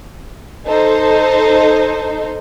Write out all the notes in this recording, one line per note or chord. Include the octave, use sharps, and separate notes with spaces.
D#4 A4 C5